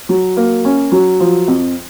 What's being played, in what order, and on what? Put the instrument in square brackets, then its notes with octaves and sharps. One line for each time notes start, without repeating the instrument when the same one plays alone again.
[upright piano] F#3
A#3
C#4
F#3
F3
F2